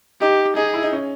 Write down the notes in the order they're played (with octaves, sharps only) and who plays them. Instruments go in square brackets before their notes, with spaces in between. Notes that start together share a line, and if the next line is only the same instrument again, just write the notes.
[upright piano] D#4 [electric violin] G4
[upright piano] D#4 [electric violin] G#4
[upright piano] E4
D#4
C#4